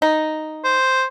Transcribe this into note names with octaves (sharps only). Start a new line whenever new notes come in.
D#4
C5